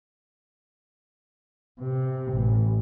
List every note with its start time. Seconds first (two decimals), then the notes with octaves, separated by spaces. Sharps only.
1.80 C3
2.33 A1